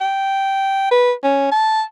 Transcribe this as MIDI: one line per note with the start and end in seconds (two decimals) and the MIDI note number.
0.01 0.86 79
0.91 1.12 71
1.23 1.48 61
1.51 1.82 81